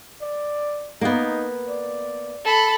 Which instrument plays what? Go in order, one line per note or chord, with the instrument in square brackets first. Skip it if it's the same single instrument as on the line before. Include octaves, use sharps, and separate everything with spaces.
[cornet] D5
[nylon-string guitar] A#3 B3 [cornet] D#4
[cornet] D5
[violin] A4 B5